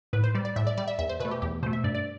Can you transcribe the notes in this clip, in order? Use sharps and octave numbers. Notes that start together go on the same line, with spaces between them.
A2 B4
C5
G3 D5
D5
A2 E5
D5
G3 D5
E5
E2 E5
C5
B2 B4
A3
G4
E2 G4
B2 A3 C5
E5
G2 D5
D5